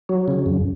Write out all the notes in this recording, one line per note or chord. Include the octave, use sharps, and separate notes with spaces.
F#3
C#3
F#2